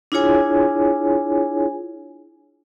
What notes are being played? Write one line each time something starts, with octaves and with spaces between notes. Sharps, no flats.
D4 E4 F4 G#4 C#5 G#5